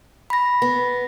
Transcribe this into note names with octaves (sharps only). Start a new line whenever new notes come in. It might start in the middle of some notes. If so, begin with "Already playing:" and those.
B5 A#6
B3